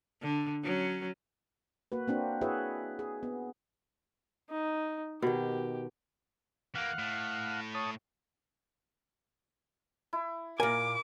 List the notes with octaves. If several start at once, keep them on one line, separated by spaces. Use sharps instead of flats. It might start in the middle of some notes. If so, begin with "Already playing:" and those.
D3
F#3 C#4
A#3 F#4 B4
A#3 C4 D4 F#4
E4 F#4 G#4 B4 C#5 E5
G#4
B3
D#4
B2 D#3 G4
E3 A#3 F5 F#5
A2
C#5 A5 D#6
E4
A#2 A#4 G#5 D6